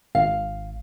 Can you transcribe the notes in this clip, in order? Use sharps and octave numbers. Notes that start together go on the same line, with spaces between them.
G#1 F5